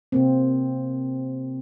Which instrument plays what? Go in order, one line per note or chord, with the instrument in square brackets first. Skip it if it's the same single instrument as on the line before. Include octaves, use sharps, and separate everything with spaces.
[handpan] C3 A#3 C4